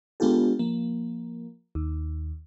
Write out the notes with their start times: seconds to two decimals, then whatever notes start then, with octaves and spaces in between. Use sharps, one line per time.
0.20 G#3 B3 D4 F4 G4 A4
0.59 F3 A#3
1.75 D#2